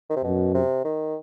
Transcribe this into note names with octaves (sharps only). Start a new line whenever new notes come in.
D#3
C3
F#2 B2
C3
D#3